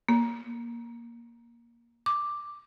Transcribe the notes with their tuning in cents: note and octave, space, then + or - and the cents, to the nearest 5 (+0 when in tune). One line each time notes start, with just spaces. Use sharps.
A#3 +10
D6 +0